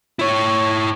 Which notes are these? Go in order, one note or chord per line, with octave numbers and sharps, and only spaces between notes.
E4 C#5